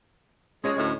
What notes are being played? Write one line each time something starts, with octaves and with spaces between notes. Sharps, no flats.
G#3 C#4 C#5 D#5
D2 A2